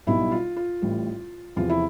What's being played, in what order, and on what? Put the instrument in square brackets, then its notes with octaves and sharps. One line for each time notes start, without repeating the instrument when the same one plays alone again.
[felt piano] B1 B2 G3 E4
F4
F4
A1 A2 G3
E2 C3 F3 F4
E4